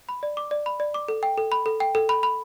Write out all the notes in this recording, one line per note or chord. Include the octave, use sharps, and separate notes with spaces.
B5
D5
D6
D5
B5
D5
D6
A4
G5
A4
B5
A4
G5
A4
B5
B5